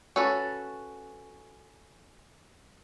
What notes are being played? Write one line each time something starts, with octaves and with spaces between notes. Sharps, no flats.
C#4 F#4 A4 B4